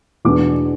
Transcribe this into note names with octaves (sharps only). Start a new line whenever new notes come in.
E2 B2 B3 D4 D6